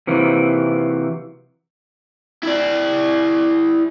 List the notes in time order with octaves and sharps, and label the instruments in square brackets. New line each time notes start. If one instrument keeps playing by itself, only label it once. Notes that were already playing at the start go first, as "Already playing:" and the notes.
[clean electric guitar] C3 D#3 E3 F#3 A#3
[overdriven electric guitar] E4 D5